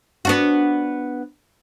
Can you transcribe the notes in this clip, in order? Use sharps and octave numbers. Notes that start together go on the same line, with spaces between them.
B3 D4 F#4